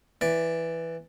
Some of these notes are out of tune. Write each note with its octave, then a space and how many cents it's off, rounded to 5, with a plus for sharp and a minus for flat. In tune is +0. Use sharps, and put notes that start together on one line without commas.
E3 +0 D5 +0